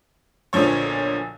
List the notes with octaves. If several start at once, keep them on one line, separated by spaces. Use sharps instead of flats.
B1 A#2 D3 F3 C#5